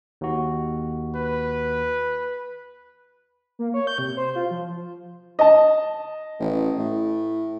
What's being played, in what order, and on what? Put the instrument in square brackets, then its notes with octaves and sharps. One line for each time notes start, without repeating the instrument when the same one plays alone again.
[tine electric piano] D#2 F#4
[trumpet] B4
[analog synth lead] A#3
C#5
G6
C3
C5
F4
F3
[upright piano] D#5 A5
[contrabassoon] A1
A2